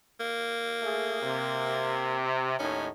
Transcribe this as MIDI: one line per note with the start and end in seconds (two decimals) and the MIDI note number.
0.20 2.19 58
0.83 1.19 57
0.83 1.19 68
1.23 2.57 48
2.59 2.88 39
2.59 2.88 45
2.59 2.88 61
2.59 2.88 63